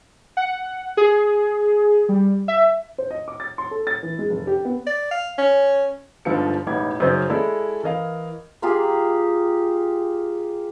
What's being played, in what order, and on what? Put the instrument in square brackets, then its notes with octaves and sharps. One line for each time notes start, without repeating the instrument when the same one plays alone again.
[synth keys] F#5
G#4
G3
E5
[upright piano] C5
D#5
D6
A6
C6
A4
A6
E3
G#3
F1
G4
B3
[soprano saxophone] D5
F5
C#4
[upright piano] G1 G#2 D3 F3 F4 C#7
E1 A1 D#4 E4 D6 G#6
F#2 C#3 D#4 C5 D#5 A6
G#3 E4 A4 D5
E3 A#4 D#5 F5
[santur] A#3 F4 G4 G#4